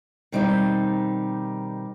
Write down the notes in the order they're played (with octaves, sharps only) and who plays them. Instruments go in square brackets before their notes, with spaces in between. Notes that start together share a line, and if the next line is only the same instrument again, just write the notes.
[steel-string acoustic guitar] B2 D#3 G3 C4 D#4 G4